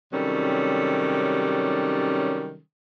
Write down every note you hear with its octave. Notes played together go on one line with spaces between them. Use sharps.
C3 D#3 F#3 G3 C#4 A4